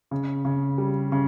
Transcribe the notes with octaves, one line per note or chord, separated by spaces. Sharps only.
C#3
C#3
G3
C#3